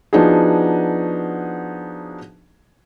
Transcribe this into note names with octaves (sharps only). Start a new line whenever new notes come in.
F3 B3 D4 D#4 F#4 G#4